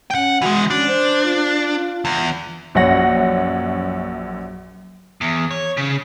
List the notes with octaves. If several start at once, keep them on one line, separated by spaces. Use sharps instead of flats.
C#4 F#5 G5
E3 G#3 F#4
C#4 D4
C5
F4
E2
A#1 F#2 C#4 F#5 A#6
E2
C#5
C#3